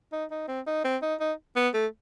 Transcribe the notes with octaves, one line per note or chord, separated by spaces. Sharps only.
D#4
D#4
C4
D#4
C4
D#4
D#4
B3
A3